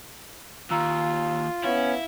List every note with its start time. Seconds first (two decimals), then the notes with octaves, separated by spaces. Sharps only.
0.71 D#2 F4 A#5 E6
1.64 B3 C#4 E4 F5